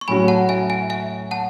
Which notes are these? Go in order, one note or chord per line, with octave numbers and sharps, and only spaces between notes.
C#6
A2 F#3 C#4 F#4 G#5 B5
F#5 A5
E5 G#5
E5 G#5
E5 G#5
F#5 A5